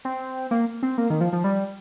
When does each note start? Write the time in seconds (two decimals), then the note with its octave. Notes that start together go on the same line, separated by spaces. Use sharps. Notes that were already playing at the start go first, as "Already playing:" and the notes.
0.05 C4
0.51 A#3
0.83 C4
0.98 A#3
1.10 D#3
1.21 F3
1.33 F3
1.44 G3